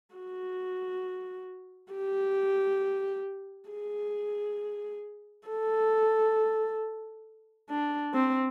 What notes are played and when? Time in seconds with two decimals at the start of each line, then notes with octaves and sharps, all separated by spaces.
0.15 F#4
1.93 G4
3.70 G#4
5.48 A4
7.70 D4
8.14 C4